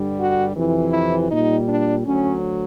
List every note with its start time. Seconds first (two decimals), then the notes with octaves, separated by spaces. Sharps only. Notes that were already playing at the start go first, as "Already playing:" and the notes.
Already playing: G2 D3 G3
0.18 F#4
0.56 F2 C3 E3
0.93 E4
1.31 A#2 G3 D#4
1.68 D4
2.05 D2 D3 F#3 C#4